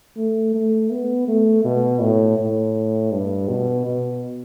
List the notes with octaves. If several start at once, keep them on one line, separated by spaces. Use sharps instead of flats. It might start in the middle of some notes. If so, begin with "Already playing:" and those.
A3
A3
B3
A3
B2
A2
A2
G2
B2
B2